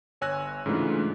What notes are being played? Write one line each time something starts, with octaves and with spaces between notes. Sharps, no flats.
G1 C#5 G#5 E6 F#6 A#6
G#2 C#3 E3 A3 D4 F4